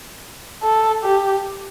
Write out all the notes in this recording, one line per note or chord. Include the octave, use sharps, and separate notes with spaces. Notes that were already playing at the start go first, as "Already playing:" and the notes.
A4
G4